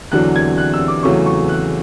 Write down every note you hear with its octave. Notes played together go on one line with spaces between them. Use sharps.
E2 D3 F#3 F#6
G#6
F#6
E6
D6
E2 C#3 F#3 A3 C#4 C#6
C#6
F#6